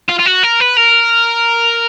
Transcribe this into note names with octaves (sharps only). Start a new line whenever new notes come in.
F4
F4
F#4
A#4
B4
A#4